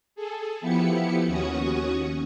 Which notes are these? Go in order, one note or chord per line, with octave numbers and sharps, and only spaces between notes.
G#4 A4
F3 B3 E4 G4 B4 C#7
D#2 C#4 F#4 C#6 D#6